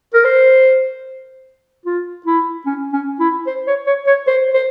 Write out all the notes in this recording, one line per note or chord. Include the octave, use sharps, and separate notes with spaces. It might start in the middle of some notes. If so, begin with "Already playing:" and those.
A#4
C5
F4
E4
C#4
C#4
E4
C5
C#5
C#5
C#5
C5
C5